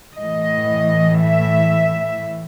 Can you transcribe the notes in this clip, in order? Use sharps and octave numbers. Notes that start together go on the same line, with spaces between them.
A2 E3 D#5
E5